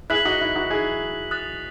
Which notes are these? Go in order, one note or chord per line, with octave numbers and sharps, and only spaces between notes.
E4 G#4 F#6 B6 F#7
D#4 F#4
E4
D#4 F#4
E4 G#4
D#6 F#6 A6